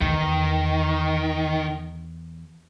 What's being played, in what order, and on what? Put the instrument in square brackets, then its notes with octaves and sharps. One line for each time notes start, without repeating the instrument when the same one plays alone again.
[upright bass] E2 [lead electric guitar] D#3